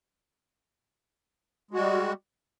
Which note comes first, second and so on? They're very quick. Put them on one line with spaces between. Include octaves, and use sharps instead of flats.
G#3 F#4 G3